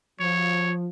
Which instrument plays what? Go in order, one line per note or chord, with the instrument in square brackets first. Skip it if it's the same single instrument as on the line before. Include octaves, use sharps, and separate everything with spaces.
[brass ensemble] F3 [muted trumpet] C#5